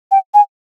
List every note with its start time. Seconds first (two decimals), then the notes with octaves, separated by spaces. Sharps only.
0.11 G5
0.34 G#5